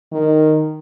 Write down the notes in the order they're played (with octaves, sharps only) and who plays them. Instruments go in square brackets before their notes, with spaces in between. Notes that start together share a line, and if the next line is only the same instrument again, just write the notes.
[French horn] D#3